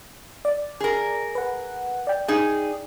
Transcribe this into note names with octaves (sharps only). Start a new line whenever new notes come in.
D5
G#4 A#4
B4 F#5
D5 G5
D#4 G#4